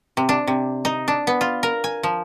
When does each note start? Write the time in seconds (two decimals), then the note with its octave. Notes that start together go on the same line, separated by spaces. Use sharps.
0.17 C3
0.29 D4
0.47 C3
0.85 D#4
1.08 D4
1.27 B3
1.41 F4
1.63 A#4
1.84 G#5
2.03 F3